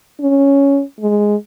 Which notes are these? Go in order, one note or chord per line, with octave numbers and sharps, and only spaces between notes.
C#4
G#3